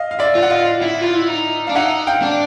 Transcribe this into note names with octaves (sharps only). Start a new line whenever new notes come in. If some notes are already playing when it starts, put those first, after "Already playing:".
Already playing: D#5 F5
F5
D5 E5
F4
F#5
D#5 F5
E4
F4
E4
D#4
D4 F5
D#4 E5 F#5
F5 G5
D4